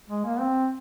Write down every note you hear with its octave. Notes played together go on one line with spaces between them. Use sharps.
G#3
A#3
C4